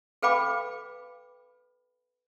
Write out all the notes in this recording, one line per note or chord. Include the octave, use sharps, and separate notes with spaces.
A4 B4 F5 G5 B5 D6